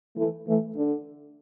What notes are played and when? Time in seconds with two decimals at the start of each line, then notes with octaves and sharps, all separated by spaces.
0.16 E3 A3
0.46 E3 A3
0.75 D3